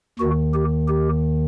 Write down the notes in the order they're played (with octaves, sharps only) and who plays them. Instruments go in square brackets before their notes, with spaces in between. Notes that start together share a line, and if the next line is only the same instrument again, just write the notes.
[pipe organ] D#2 D#3 F#4
G4
G4